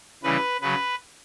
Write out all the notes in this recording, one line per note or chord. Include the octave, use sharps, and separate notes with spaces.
C#3 E3 G3 B4
C#3 F#3 B4